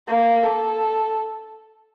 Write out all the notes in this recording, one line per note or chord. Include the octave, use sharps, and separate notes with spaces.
A#3
A4